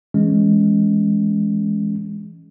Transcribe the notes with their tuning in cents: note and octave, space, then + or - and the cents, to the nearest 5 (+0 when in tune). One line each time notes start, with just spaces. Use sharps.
E3 +0 G#3 +0 C#4 +0